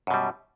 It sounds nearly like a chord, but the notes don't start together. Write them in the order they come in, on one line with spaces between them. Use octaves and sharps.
F#2 B2 G3